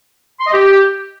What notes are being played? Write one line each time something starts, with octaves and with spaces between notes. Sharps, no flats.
C6
D#5
G4